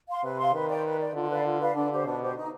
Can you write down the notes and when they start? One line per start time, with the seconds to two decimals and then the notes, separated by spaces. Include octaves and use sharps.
0.08 F5 C6
0.23 C3 B4
0.38 F5 C6
0.53 D#3 B4
0.69 D5 G5
0.84 B4
0.99 D5 G5
1.14 D3 F4
1.30 B4 D5 F5
1.45 F4
1.60 B4 D5 F5
1.75 D3 D4
1.90 G4 C5
2.05 B2 D4
2.21 G4 C5
2.36 D#4